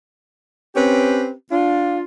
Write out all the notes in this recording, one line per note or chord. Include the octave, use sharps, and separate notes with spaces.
C4 C#4 G4 B4
D4 F4